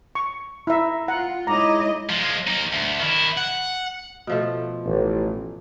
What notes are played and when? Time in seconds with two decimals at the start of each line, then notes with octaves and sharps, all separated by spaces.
0.15 C#6
0.67 E4 E5 A#5
1.08 F4 F#5
1.47 G#3 D#4 E4 C#5 D#5 A#5 D6
2.10 F3 G#3
2.48 A#3 D#4
2.72 D2
2.99 D#3 E4
3.37 F#5
4.27 B2 F3 A3
4.85 A1